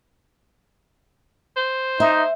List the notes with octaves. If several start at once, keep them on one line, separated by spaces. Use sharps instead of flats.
C5
D#4 E5